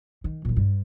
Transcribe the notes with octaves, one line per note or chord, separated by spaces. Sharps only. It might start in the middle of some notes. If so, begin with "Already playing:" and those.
D#3
A#2 F3
G2